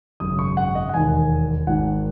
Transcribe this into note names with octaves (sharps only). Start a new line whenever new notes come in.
G#1 F#2 C#3 D#6
C#6
F#5
D#5
F#5
E1 D#2 D#3 G#5
G#1 G#2 D#3 F#5